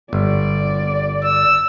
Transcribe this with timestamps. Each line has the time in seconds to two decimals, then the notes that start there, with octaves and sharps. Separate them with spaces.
0.13 G1 D5
1.24 E6